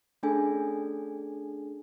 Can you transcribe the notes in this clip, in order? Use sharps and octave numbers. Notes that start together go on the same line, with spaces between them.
A3 C#4 D4 G#4 A4 G#5